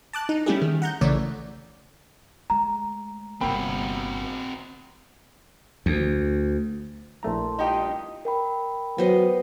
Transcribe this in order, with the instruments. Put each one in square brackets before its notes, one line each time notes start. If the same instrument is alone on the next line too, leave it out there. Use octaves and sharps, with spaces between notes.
[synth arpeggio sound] A5 D6 F#6
D#4
G3 A3 C#4 E4 G4 G#4
D#3
F#5 A#5 G6
A#1 C#3 E3 A3 C#5 D5
[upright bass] G#3 A3 [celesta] A#5
[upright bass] G1 C3 [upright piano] A#3 G5 B5 [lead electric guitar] C4 F#4
[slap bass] D2
[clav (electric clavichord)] A#1 A3 A#5 [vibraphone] E4 A5 C6
[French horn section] G2 A#2 D#5 [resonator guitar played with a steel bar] D#4 G4
[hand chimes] A#4 G5 B5
[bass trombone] F#3 [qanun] B3 C5 D#5